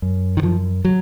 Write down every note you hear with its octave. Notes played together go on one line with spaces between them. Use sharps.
F#2
D#3
F#2 F3
F#3